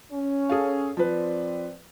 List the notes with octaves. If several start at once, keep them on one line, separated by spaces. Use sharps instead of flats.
C#4
G#4 A4 F5
F3 C4 B4 D5